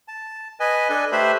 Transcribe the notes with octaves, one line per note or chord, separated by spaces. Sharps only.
A5
B4 D#5 G#5
D4 A4 G#5
A3 G4 B4 C5 E5 B5